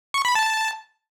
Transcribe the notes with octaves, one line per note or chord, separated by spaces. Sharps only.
C#6
B5
A5